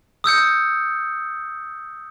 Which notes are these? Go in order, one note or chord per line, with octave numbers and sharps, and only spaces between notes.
D#6 E6 G6 C#7